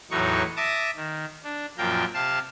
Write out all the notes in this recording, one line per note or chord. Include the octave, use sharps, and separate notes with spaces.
E2 A2 F#3 D#4 C#6
E5 A5 D6 D#6 A#6
D#3
D4
F#2 A#2 F3 F4 A#4 G5
C3 F5 A5